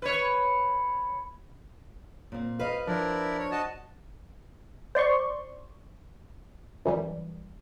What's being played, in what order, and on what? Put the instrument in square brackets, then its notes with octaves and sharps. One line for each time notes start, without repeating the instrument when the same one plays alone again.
[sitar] B4 C#5
[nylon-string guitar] A#2 C4
[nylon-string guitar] F#4 C5 D#5 [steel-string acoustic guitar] B4 [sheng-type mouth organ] F5
[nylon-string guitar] F3 [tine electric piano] D4 C5 [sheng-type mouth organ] E4 A#4 D5
[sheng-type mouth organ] C#5
F#4 D#5 A5
[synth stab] C5 D5 C6 C#6
F#2 E3 G3